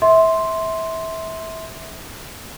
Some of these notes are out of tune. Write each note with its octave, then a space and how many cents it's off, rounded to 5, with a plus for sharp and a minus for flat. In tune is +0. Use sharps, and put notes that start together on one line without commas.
E5 -20 C6 +0